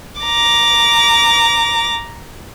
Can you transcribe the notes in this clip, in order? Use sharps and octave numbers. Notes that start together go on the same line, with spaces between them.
A#5 D6